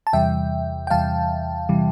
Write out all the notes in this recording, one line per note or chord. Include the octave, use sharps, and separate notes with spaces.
A5
E2 C3 E3 G3 E5 G5
G5
E2 C3 E3 G3 F5 A5
C3 E3 G3